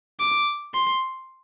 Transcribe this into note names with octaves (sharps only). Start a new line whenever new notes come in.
D6
C6